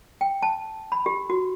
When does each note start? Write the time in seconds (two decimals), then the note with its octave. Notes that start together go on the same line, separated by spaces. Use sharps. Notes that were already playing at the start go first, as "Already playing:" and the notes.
0.21 G5
0.42 A5
0.92 B5
1.06 G4
1.30 F#4